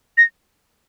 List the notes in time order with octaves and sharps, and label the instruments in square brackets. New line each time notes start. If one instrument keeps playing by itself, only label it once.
[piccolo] A#6